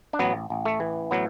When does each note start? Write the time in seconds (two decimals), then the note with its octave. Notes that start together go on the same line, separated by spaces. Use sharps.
0.13 D4
0.19 A1 F#3 B3
0.50 A1
0.65 A3
0.80 E3
1.11 A2 F#3 B3